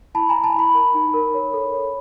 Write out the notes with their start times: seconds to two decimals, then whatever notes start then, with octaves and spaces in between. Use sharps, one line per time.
0.15 E4 A5 B5
0.29 E4 G#5 A#5
0.44 A5 B5
0.55 E4 A5 B5
0.74 A#4
0.94 D#4
1.14 A#4
1.34 C#5
1.53 A4
1.73 C#5